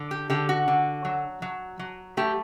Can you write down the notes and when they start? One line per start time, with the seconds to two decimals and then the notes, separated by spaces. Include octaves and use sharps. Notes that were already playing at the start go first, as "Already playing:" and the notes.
Already playing: D3
0.11 G4
0.30 D3 G4
0.49 F#4
0.68 D3
1.05 F#3
1.42 F#3
1.79 F#3
2.17 A3 G4